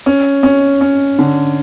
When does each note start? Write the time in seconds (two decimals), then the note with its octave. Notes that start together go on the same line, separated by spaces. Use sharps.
0.06 C#4
0.43 C#4
0.81 C#4
1.19 D3